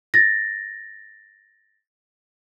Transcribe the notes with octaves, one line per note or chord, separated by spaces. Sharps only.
A6 A#6